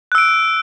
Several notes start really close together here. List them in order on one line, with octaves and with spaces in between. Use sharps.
F#6 E6 D7